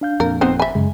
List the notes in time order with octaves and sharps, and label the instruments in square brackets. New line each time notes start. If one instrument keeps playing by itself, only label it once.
[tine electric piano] D4 F5 G6
[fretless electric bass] F2 A#2 [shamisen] A#4
[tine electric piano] G1 [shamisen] B3 D#4 C5 [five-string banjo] C4
[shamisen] E5 G#5 [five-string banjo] B5
[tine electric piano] F#2 C#3 [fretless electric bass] G#3